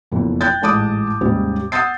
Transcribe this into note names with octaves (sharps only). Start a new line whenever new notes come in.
F#1 F2 B2
G5 F#6 G6 A6
A1 G#2 A5 D6 D#6 D7
D#2 G#2 C3 G3 C4 C#4
F#5 D#6 E6 G6 A6 C7